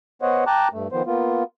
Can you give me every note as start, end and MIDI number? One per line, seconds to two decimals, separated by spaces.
0.22 0.44 59
0.22 0.44 72
0.22 0.44 73
0.22 0.44 75
0.22 0.44 78
0.47 0.68 79
0.47 0.68 81
0.47 0.68 82
0.47 0.68 86
0.47 0.68 90
0.73 0.88 43
0.73 0.88 57
0.92 1.03 51
0.92 1.03 53
0.92 1.03 59
0.92 1.03 72
1.06 1.44 58
1.06 1.44 59
1.06 1.44 65